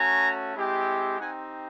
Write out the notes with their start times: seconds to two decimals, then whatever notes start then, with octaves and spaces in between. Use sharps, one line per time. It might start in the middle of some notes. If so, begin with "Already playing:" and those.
Already playing: A3 C#4 F#4 G#5 A#5
0.55 G#3 C4 E4 G4
1.19 C4 D#4 G4 F#5 G#5